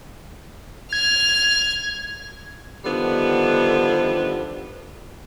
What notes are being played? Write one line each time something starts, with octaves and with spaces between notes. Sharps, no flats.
F6 G#6
D3 D#3 F3 G3 B3